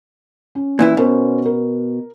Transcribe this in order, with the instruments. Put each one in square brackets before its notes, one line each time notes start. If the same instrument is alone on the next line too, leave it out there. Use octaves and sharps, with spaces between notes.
[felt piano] C#4
[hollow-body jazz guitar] A#2 E3 E4
[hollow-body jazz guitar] B2 [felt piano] C#4 A#4 C5
[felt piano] A#4